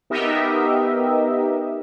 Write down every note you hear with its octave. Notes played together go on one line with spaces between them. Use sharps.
B3 D#4 G4 A#4 D#5 E5